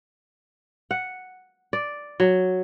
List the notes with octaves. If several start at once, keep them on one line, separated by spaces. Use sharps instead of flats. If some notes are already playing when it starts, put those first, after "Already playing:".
F#5
D5
F#3